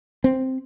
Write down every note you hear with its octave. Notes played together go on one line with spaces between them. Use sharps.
C4